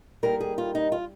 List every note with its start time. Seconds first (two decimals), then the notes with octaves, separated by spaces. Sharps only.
0.23 D#2 D#3 G3 A#4
0.40 G#4
0.58 F4
0.75 D#4
0.92 F4